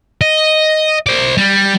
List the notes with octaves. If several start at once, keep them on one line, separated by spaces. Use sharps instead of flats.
D#5
C5 D5
G3